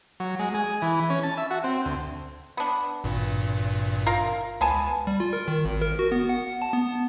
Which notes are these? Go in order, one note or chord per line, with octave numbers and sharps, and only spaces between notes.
F#3
G#3
G#4
E3
C#4
A5
E5
F#4
C4
D2
B3 D4
G#1 G2 A#2
F4 A#4 F5
C#2 B3 G#5 A5
G3
F4
A#4
D#3
G#1
A#4
F#4
B3
F#5
A5
B3